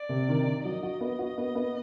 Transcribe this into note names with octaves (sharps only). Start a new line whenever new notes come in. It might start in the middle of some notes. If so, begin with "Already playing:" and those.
Already playing: D5
C3
D#3
D#3
F#3 D#5
F#4
B3
F#4
B3
B3